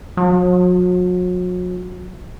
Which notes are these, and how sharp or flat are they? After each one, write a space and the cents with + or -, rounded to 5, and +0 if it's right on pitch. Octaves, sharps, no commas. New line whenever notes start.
F#3 -40